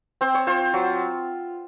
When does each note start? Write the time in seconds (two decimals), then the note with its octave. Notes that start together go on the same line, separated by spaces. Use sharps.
0.21 C4 C5
0.35 C#5
0.47 F4 C5
0.74 F#3